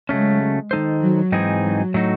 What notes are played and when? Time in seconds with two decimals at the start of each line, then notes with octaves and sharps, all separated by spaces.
0.09 C#3 F#3 G#3 A3 C#4
0.71 D#3 G#3 D#4 A4 C5
1.02 F#3
1.32 G#2 E3 C4 D#4 G#4
1.63 F#3
1.94 A2 F#3 A3 D#4 F#4